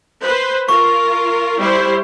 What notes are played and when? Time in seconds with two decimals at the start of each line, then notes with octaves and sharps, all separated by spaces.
0.22 B4 C5
0.69 F4 A#4 C#6
1.59 G3 E4 C5